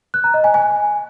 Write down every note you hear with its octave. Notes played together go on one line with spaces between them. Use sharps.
F#6
A#5
D#5
G#5
G#5